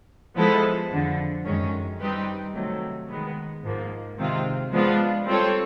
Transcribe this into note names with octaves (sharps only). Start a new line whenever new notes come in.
F3 G#3 B3 E4 A4
F2 D3 F3
F#2 D#3 G#3 C#4
G3 C4 D#4 G4 B4
C3 D#3 F#3 A3
D#3 G#3 B3
G#2 F3 A#3
C3 D#3 G#3 C4 F4
F3 G#3 B3 D4 F4
G3 C4 F4 A4 C#5